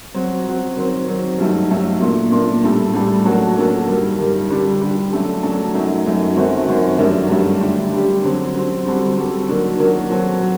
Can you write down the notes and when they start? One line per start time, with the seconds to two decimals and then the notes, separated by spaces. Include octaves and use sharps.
0.14 F#3 C4 F#4
0.46 F#3 C4 F#4
0.76 D#3 F#3 C4
1.07 D#3 F#3 C4
1.39 G2 F#3 A3 D#4 A4
1.70 G2 F#3 A3 D#4 A4
2.00 A#2 A3 D4
2.32 A#2 A3 D4
2.63 A2 G3 D4 A4
2.94 A2 G3 D4 A4
3.25 F#3 A#3 D4 F#4 A4
3.56 F#3 A#3 D4 F#4 A4
3.88 G2 D#3 G3
4.18 G2 D#3 G3
4.50 D3 G3 D4 G4
4.81 D3 G3 D4 G4
5.13 F#3 A3 D4 A4
5.43 F#3 A3 D4 A4
5.74 F#2 F#3 A3 D#4
6.06 F#2 F#3 A3 D#4
6.36 F#2 D#3 A3 C4 F#4
6.68 F#2 D#3 A3 C4 F#4
6.98 G2 D#3 F#3 A3 D4
7.30 G2 D#3 F#3 A3 D4
7.61 D3 G3 D4 G4
7.92 D3 G3 D4 G4
8.23 D3 F#3 C4
8.55 D3 F#3 C4
8.85 D3 G3 C4 F#4 A4
9.16 D3 G3 C4 F#4 A4
9.49 D#3 F#3 A#3 D4 F#4
9.78 D#3 F#3 A#3 D4 F#4
10.10 F#3 C4 F#4 A4
10.41 F#3